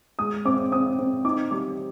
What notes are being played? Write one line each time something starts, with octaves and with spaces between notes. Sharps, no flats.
G#3 D#6
C4 D6
C4 D#6
C4
D#4 D6
G3 D6